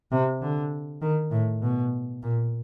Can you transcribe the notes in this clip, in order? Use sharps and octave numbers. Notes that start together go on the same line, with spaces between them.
C3
D3
D#3
A2
B2
A#2